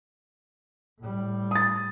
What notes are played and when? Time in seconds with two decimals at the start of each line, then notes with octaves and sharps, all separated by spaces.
1.00 A2 G3
1.51 D#6 A6